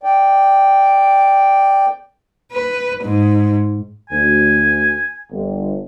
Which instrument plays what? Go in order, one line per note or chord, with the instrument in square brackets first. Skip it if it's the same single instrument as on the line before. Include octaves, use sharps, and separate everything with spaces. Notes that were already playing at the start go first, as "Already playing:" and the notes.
[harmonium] D5 G5
[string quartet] B4
G#2
[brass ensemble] D2 [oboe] G#5
[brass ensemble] G1